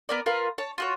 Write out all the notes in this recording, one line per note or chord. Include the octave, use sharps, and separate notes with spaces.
B3 A#4 D5
F4 A#4 B4 F5
C#5 A5
F4 F#4 C#5